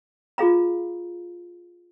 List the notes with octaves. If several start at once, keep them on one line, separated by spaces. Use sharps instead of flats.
F4 G#4 F5 A#5